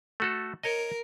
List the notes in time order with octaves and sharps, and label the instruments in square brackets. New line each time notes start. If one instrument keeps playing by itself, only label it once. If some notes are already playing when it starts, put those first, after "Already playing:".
[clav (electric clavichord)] A3 F#4 A4
[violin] A#4 [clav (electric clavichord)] C#5 D#5